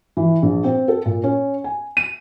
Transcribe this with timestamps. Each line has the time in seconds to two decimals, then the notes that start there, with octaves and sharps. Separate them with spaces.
0.17 E3
0.42 A#1
0.64 C4
0.88 A4
1.05 A#2
1.23 C#4
1.64 G#5
1.97 D#7